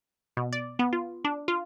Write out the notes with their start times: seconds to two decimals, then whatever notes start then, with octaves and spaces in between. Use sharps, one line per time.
0.37 B2
0.53 D5
0.79 B3
0.93 F4
1.25 D4
1.48 F4